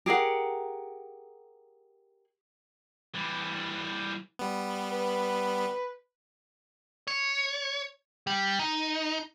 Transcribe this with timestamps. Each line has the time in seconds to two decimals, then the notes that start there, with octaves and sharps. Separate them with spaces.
0.06 G4 G#4 A#4 F#5
3.15 E3 G3
4.39 G3 B3
4.90 B4
7.07 C#5
8.27 G3
8.59 D#4